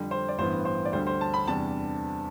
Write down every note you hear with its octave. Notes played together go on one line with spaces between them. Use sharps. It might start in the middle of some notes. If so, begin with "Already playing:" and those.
Already playing: F2 D3 G3
C5
D5
A1 G2 E3 B3 C5
C5
D5
D2 D3 G3 C5
C5
A5
B5
E2 C3 G3 D4 A5